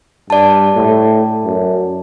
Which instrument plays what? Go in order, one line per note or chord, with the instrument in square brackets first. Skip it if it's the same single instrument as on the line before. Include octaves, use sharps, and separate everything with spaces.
[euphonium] G2 [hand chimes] D5 A5
[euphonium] A2
F#2